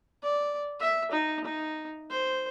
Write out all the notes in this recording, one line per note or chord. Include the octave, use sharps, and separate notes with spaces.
D5
E5
D#4
D#4
C5